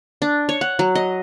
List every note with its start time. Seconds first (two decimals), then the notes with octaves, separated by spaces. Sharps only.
0.22 D4
0.49 C#5
0.61 F#5
0.79 F#3
0.95 D#5